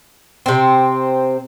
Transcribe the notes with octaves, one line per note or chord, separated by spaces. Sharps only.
C3 C4